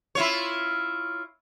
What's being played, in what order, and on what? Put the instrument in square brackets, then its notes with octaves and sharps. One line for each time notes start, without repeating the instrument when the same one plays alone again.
[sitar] E4 F4 C#5